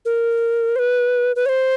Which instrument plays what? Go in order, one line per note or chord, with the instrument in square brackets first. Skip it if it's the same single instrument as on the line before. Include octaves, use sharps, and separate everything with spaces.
[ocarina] A#4
C5
B4
B4
C#5
C5